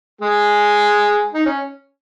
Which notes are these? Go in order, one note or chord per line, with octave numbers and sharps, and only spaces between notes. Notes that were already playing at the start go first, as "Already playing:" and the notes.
G#3 G#4
D#4
C#4